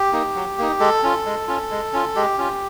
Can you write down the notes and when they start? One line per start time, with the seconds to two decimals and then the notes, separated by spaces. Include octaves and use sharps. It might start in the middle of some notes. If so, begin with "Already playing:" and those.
Already playing: G4
0.12 A#3 D#4
0.35 F#3
0.58 A#3 D#4
0.80 G#3 A4
1.03 C#4 F4
1.25 G#3
1.47 C#4 F4
1.71 G#3
1.93 C#4 F4
2.16 G#3 G4
2.38 C#4 F4